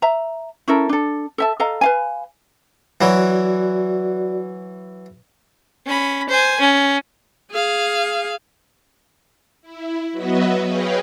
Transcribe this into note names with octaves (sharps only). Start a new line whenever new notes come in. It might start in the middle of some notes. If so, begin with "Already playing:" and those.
E5 A#5
C#4 E4 A4 A#4
D4 A4
A4 E5 A5
A4 D#5 F5 A#5
B4 F5 G#5
E3 F#3 F#4 D5
C#4 B5
C5 G#5
C#4
G#4 F5
E4
F#3 B3 F#4 B4 D#5 E5
G#4 B4 C#5 D#5 F5 G5